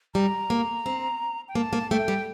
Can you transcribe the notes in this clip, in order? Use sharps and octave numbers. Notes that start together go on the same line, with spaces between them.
G3 A#5
A#3
C4
G5
A#3 A5
A#3
A3 G5
G3